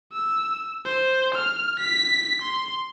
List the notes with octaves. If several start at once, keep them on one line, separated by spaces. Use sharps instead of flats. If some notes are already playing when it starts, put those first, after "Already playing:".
E6
C5
F6
B6
C6